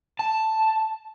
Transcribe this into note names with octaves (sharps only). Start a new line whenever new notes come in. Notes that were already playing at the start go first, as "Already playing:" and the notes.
A5